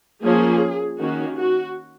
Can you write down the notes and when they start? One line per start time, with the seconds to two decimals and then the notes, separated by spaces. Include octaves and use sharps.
0.23 F3 A#3 C#4 G#4
0.98 D#3 A#3 C#4 F#4
1.36 F#4